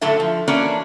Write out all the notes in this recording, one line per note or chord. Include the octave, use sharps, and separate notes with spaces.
F#2 A2 D3 F#3 A4 E5
F3
E3 A#3 C#4 D4 F#4 D5